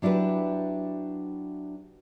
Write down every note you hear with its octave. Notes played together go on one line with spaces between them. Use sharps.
F#3 D4 E4 G4 B4